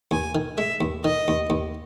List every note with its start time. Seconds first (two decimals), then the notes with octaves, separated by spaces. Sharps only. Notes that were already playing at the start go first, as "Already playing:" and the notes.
0.11 D#2 G#5
0.35 D#3
0.58 G#3 E5
0.81 D#2
1.04 D#3 D#5
1.28 D#2
1.50 D#2